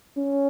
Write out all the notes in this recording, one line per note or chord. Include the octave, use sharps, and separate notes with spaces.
C#4